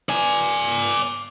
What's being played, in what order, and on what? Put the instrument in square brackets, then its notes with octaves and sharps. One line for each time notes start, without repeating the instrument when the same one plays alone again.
[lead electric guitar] D5 G#5